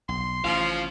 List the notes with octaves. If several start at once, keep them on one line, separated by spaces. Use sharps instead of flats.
B1 C6
A1 F3 C#4 F5